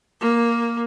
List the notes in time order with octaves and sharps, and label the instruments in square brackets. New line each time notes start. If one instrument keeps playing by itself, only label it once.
[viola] A#3